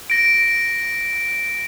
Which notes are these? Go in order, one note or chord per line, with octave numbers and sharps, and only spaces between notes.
A#6 D7